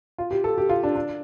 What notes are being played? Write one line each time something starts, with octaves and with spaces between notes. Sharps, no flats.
F4
G4
A4
G4
F4
D4
D4